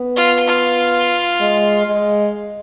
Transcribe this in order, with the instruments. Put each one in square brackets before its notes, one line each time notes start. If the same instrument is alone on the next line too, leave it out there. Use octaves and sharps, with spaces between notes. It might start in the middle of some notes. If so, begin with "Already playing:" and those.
Already playing: [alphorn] B3
[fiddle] F4
F4
[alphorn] G#3
G#3